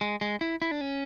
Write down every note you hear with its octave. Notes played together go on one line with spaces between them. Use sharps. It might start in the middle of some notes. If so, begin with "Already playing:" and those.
G#3
G#3
E4
E4
D4
C#4